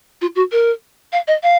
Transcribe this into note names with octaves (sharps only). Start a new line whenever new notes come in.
F4
F#4
A#4
F5
D#5
F5